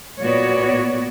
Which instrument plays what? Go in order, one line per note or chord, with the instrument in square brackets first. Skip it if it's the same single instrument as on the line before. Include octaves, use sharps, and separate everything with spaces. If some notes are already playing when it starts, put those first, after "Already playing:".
[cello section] A#2 B3 F#4 C#5 D5